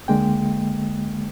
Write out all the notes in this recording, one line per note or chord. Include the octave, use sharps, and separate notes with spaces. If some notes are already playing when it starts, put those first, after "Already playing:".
C#2 D3 G#3 A#3 G5